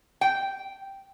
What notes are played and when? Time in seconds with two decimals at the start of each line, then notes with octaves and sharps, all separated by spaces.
0.21 G5